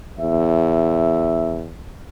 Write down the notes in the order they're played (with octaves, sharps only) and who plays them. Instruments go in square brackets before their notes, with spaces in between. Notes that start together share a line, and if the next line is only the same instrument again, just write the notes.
[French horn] E2 [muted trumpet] E5